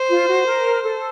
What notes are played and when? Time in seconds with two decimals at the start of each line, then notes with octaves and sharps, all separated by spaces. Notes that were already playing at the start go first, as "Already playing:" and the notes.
Already playing: C5
0.09 F4
0.28 F#4
0.46 A#4
0.83 A4